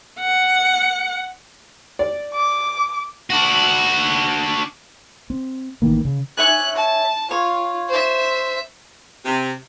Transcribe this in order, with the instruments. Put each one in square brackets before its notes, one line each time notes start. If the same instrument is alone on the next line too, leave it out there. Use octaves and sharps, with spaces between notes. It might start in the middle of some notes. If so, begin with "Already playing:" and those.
[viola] F#5
[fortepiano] D5
[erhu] D6
[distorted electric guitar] D4 F#4
[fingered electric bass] C4
A1 D#3 E3 A#3
C#3
[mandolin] C#5 E5 G#5 [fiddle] F#6
[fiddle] A5
[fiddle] F4 [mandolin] C#5
[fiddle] C5 E5
[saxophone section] C3